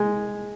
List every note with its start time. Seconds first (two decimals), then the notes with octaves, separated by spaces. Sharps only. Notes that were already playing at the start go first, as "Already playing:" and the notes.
Already playing: G#3